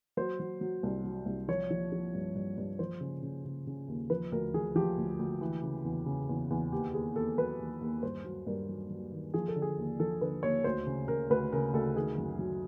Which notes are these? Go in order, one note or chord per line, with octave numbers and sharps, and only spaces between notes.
F#3 C5
F#3
F#3
C2
F#3
C2
F3 C#5
F3
F3
G2
G2
G2
F3 C5
C#3
C#3
C#3
C#3
D#2
F3 B4
D2 A#4
F3 G#4
F3 G4
D2
D2
E3
C#3
E2
C#3
E2
E2
D#2 G4
D#2 G#4
D#2 A4
F#3 B4
D#2
D#2
G2 C5
F#3
G2 A#4
F#3
F#3
D#3
F3 G#4
A4
D3
G#4
D#2
F3 A4
D3 B4
D#2 C#5
D2 C5
C#3
C#3 A#4
D2 B4
C#3 A#4
D2 A4
D#3 G#4
F#2
F#3